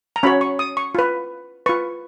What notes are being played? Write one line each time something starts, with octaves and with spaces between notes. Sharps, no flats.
A#5
C#4 F#4 C#5 B5
C#6
D#6
C#6
F4 B4
F4 B4 C#6